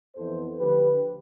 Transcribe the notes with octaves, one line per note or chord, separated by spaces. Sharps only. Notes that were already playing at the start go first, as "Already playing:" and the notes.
F2 E3 B3 A4 C5
D2 D3 F3 G4 B4